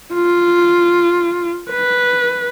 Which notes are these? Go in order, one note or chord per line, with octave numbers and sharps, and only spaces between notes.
F4
B4